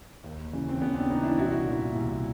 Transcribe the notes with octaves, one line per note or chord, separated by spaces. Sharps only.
D#2
C#3 E3
C4
D#2 B3 C#4
C4 D4
C#3 E3 C#4 D#4
D4 E4
C2 E4 F#4
A#2
C2